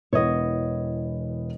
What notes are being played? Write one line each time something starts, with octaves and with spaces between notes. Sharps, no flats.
E1 E3 B3 C#5 D#5